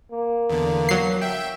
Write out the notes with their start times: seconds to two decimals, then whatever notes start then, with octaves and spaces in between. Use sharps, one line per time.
0.12 A#3
0.50 E2 D3
0.89 F#3 C7
1.21 E5 G5